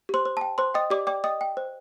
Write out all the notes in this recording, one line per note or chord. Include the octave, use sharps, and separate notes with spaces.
G4 C5 C6
C5
G5 A5
C5 C6
D#5 G5 D#6
G4 D5 D6
D5 G5 D6
D#5 G5 D#6
G5
C5